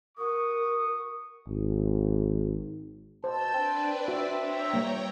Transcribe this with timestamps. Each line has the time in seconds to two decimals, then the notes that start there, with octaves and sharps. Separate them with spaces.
0.18 F#4 A#4 C#6 D#6
1.47 G#1
3.24 B2 C5 A5 E6 G6
3.54 C4 D4 B4 D5
4.08 F#4 E5
4.37 C#5 G5 A#5
4.74 G3 A#3